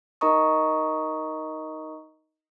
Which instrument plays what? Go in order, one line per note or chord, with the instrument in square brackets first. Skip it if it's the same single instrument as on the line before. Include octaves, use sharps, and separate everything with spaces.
[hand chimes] D#4 A#4 D#5 A#5 C#6 D#6